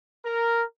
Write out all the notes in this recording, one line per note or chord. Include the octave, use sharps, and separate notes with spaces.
A#4